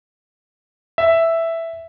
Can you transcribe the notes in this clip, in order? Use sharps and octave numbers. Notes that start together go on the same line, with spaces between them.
E5